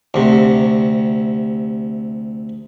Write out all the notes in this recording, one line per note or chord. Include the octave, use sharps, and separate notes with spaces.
D2 C3